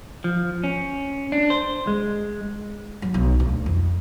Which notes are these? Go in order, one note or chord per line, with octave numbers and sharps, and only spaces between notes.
F3
C#4
D4
C5
G#3
F#3
B1
D2
F2